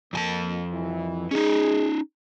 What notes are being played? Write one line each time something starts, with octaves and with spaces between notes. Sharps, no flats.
F2 A#3 G#5 A5
C2 E3
G#3 C#4 D#4 G#4